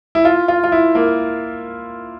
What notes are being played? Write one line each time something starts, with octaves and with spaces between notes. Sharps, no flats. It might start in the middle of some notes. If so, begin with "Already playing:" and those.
E4
F4
F4
F4
E4
A#3